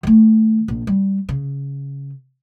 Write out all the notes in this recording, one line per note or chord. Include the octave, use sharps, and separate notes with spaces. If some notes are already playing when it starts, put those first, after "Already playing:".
D#3 A3
A#1
G3
C#3